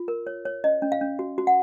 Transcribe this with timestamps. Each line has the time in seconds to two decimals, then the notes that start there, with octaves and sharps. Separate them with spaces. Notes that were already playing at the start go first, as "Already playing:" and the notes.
Already playing: F4
0.08 A#4
0.27 C#5
0.45 C#5
0.64 C#4 D#5
0.82 C#4
0.92 F5
1.01 C#4
1.19 F#4
1.38 F#4
1.47 F#5